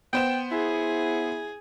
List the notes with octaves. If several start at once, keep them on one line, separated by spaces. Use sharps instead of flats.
B3 C5 G5 E7
E4 G#4